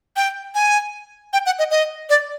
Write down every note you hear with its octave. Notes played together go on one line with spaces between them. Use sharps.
G5
G#5
G5
F#5
D#5
D#5
D5